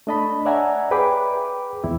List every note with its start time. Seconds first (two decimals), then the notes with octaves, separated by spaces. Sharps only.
0.07 A3 D4 D#5 A5 B5
0.45 C#5 D5 E5 F#5 G#5 A#5
0.91 G#4 B4 G5 B5 D6
1.84 E2 E4